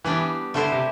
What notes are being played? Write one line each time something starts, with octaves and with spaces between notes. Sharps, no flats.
E3 G3 B3 D4 G4
D3 A3 E4 G4 C5
C3